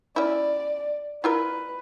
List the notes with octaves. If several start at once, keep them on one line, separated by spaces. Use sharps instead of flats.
C#4 E4 D5
E4 F4 A#4 B4